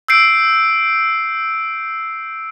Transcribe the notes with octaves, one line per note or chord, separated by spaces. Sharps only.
E6 G6 C7 D7